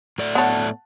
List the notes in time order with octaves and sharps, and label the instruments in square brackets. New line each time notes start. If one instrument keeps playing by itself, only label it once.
[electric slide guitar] A2 A3 D5
[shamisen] B3 C#5 [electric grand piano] F#5 A5